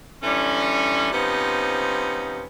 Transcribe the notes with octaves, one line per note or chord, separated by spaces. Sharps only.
D3 E3 G3 C#4
C3 F3 B3 C#4 D#4